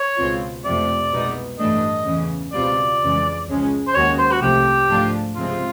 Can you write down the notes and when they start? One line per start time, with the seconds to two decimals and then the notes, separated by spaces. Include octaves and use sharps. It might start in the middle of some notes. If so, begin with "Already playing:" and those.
Already playing: C#5
0.17 C#2 B2 G#3 C4 F4
0.64 F2 C3 F3 A3 D5
1.11 C2 B2 G#3 B3 D#4
1.58 A1 G2 E3 A3 D4 D#5
2.05 E2 C#3 E3
2.53 C#2 B2 G3 C4 F4 D5
3.00 F2 C#3 E3 G#3
3.47 C#2 C#3 F3 G#3 C#4
3.87 C5
3.94 D#2 D#3 G#3 C#4 F#4 C#5
4.18 C5
4.32 F#4
4.41 C2 C3 F3 A3 G4
4.88 G#2 F3 A3 D4 F4
5.35 C#2 C3 F3 G#3 C4 F4